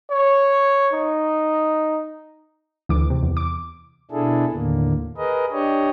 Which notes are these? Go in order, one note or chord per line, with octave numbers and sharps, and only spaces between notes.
C#5
D#4
D2 E3 D6
C3
E2
D6
B2 D4 E4 G#4 A4
D#2 A2 D3 A#3
G#4 A#4 B4 D#5
D4 G4 C#5 D#5